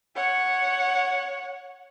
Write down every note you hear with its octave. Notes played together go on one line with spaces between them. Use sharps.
C#5 F#5